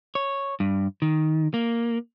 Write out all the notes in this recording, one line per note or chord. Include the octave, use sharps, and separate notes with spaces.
C#5
G2
D#3
A#3